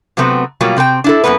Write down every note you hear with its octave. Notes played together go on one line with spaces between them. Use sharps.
C3 F#3 A3 B3 C4
B2 F#3 G3 A#3 F4
C3 C4 A#4 G5
D4 E4 A4
F#2 A#2 A#3 B3 B4